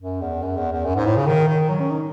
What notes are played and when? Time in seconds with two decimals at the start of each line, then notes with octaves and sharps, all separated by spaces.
0.01 F#2
0.21 E2
0.43 F#2
0.57 E2
0.72 E2
0.85 F#2
0.96 G#2
1.06 A2
1.17 C#3
1.27 D#3
1.49 D#3
1.69 F#3
1.80 C#4
1.91 D#4